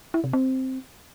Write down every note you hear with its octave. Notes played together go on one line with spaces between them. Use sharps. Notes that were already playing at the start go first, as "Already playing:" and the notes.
E4
C3
C4